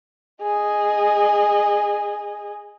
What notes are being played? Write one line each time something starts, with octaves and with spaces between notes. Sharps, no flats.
G#4 D#5